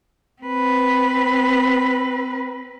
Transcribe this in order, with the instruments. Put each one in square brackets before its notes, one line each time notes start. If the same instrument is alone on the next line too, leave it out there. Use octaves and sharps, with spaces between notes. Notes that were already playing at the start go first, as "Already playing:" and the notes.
[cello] C4 B4